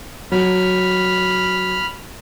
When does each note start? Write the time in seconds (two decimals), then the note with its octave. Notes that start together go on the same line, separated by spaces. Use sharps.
0.32 F#3 B5 F6